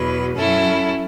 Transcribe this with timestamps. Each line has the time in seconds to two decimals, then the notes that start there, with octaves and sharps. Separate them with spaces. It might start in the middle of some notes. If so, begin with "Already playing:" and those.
Already playing: E2 B2 F#3 B4
0.36 F#2 F#3 C#4 E4 A4